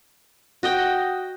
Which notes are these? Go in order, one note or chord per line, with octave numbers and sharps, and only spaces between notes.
F#4 D#5 G5